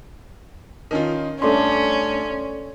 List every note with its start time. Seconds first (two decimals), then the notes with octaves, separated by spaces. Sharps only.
0.91 D#3 C#4 F4
1.42 G2 A3 C#4 A4 D5 C6